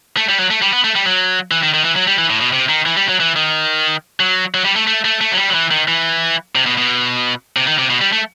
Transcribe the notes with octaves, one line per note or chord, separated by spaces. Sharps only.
A3
G3
F#3
A3
G3
B3
A3
G3
F#3
E3
D#3
D#3
E3
F#3
G3
E3
A2
B2
C3
D#3
E3
G3
F#3
E3
D#3
F#3
F#3
G3
A3
A3
A3
A3
F#3
G3
F#3
E3
D#3
E3
C3
B2
B2
C3
D#3
C3
B2
G3
A3